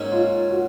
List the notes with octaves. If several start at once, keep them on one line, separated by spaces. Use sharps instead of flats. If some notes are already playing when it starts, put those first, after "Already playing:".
Already playing: G#2 F#3 A#3 C#4 D#4
F4
F#4